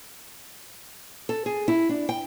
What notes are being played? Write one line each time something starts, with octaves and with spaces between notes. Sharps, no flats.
A4
G#4
E4
D4
G5